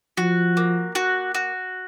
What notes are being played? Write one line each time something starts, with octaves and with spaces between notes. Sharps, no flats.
F3 F#4
A#3
F#4
F#4